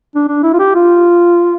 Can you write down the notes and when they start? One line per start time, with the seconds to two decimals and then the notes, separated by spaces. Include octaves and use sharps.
0.16 D4
0.28 D4
0.44 E4
0.54 F4
0.59 G4
0.75 F4